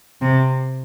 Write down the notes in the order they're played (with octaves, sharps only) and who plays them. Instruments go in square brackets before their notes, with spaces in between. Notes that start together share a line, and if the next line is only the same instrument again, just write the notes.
[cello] C3